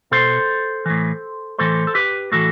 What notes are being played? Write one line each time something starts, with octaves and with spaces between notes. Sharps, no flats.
B2 A4 C5
A2 E3
A2 E3 A4 C5
A4
G4 B4
A2 E3 F#4 A4